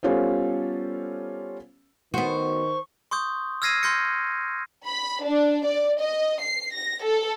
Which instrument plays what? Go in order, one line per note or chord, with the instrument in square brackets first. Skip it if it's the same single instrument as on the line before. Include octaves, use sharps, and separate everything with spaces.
[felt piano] G3 B3 C#4 F4 A4 C5
[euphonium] D#3 [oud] B3 F#4 [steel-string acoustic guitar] C5 [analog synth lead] C#6
[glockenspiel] C6 C#6 D#6 G6
E6 F6 G#6 A#6 C7 D#7
C6 F6 G6 A#6 C#7
[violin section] B5
D4
D5
D#5
C7
A#6
A4